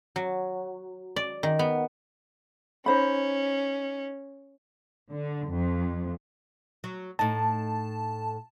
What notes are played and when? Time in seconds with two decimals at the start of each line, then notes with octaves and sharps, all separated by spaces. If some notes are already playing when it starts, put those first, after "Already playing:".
0.16 F#3
1.16 D5
1.43 D#3
1.59 B3
2.86 C#4 D#4 C5 B5
5.11 D3
5.50 F2
6.84 F#3
7.19 A2 D#4 A5